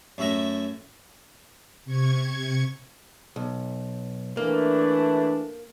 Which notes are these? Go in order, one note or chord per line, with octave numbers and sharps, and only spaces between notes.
F#2 A3 F#4 E5 A#5
C3 C#6 G#6
B1
E3 A3 A#3 D4